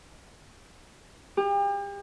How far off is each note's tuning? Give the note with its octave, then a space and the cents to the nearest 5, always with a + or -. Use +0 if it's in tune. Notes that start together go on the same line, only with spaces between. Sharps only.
G4 +40